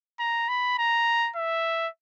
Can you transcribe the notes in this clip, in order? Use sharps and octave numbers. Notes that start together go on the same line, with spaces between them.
A#5
B5
A#5
E5